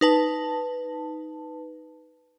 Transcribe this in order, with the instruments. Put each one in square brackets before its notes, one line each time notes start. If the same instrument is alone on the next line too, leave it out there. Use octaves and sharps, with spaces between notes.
[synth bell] D#4 B4 A5